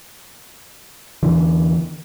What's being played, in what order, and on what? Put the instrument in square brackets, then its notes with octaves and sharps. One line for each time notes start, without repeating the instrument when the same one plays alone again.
[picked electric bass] E2 D3 E3